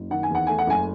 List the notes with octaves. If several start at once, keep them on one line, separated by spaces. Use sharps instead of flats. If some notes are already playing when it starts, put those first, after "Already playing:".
Already playing: F#1
D#3 F#5
G#5
E2 F#5
A3 G#5
F#5
F#1 G#5